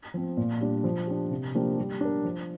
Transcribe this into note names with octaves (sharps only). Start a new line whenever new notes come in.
F3 C4
A#2
G3 D4
F3
D4 G4
C3
F3 A#3 D4 G4
G3
D4 A#4
F3